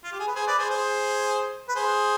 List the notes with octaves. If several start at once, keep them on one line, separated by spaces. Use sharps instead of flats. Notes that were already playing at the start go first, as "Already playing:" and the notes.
F4
G4
G#4
B4
G#4 C5
B4 D5
G#4 C5
G#4 C5
B4
G#4 C5